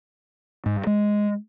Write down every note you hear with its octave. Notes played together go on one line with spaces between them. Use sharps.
G#2
G2
G#3